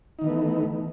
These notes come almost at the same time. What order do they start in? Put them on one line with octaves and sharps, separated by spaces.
D#4 D#3 E3 B3 A3